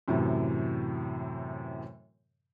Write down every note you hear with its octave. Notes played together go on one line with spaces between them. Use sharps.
F#2 A2 C3 E3